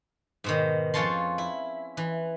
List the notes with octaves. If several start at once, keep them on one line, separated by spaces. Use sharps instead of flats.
G#2 B2 D#3
F2 C#4 F4 C#5 A5 C6
E4
E3